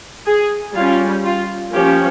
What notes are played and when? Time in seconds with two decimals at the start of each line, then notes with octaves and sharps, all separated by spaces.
0.27 G#4
0.75 G3 C#4 F4
1.24 F4
1.73 F3 A#3 C#4 G4